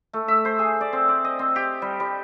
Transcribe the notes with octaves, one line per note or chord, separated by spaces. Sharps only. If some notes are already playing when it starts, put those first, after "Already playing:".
A3
E5
C5
G#4
D5
C4
D5
D#5
C4
G4
G3
G3